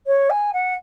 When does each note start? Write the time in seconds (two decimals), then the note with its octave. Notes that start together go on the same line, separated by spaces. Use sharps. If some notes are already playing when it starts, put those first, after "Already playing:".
0.06 C#5
0.30 G#5
0.53 F#5